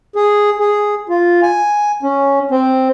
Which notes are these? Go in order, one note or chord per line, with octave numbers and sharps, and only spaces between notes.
G#4
G#4
F4
G#5
C#4
C4